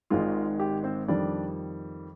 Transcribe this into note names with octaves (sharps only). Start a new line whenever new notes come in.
G#1 G#2 D#3 G#3 F4
G4
C4 C5
F2 D#3 G3 D4 D5